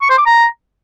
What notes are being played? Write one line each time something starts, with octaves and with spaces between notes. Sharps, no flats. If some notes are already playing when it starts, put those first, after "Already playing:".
C#6
C5
D6
A#5